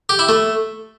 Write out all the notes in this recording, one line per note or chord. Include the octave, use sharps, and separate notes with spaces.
G4
E4
A3